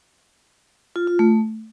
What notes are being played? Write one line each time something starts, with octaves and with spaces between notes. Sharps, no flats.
F4
F4
A3